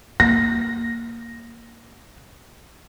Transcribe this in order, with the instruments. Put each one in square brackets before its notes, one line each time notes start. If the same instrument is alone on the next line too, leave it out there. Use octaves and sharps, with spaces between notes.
[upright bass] A#3 [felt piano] A#6